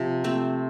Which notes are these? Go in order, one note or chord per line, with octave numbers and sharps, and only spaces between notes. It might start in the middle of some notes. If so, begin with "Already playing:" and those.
Already playing: C3 F3
A3 C4